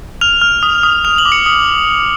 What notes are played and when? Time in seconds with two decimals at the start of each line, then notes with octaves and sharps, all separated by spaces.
0.21 F6 F7
0.41 F6
0.63 D#6
0.83 D#6
1.05 F6 F7
1.18 F#7
1.25 D6
1.32 C#7
1.46 D#6